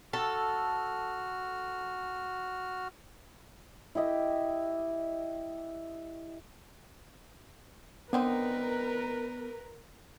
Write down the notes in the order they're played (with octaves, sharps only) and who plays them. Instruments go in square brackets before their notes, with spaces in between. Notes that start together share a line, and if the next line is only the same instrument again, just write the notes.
[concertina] F#4 F6 [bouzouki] A4
[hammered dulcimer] E4 G4 D#5 E5
[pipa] D3 C4 D#4 [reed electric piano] B3 [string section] A#4 [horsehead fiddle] B4